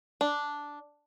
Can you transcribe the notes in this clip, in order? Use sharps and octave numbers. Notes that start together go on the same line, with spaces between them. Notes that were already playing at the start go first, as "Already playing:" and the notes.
D4